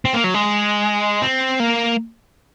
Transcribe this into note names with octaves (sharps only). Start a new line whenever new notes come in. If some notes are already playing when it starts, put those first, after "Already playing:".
C4
A#3
F#3
G#3
C4
A#3